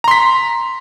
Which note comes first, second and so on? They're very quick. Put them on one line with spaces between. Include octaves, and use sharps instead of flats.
A#5 C6 B6